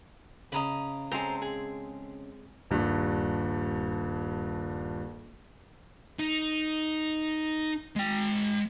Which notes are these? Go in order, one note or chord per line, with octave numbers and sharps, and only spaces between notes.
C#3 D#5 A#5 B5
G#3 C4 A4 C5 A#5
G#4
D#1 G2
D#4
G#3 G5